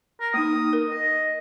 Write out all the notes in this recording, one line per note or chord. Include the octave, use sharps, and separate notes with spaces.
A#4
A#3 D#4 D#6
A#4
D#5